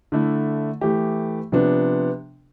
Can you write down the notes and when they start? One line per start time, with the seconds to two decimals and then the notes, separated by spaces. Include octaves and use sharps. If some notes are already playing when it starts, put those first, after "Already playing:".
0.12 D3 A3 E4
0.81 E3 A3 E4 G4
1.52 C3 F3 B3 D4